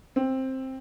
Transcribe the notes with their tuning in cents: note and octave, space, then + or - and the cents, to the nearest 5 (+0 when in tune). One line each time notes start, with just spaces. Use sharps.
C4 +10